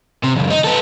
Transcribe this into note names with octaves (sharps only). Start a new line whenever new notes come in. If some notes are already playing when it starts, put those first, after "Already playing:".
C3
C#2 F#2
D#4
B3 A4